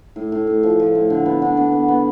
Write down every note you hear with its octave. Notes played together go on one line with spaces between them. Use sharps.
A2
A2
A2
F3
F3
A2
D3
B3
D4
D4
B3
B3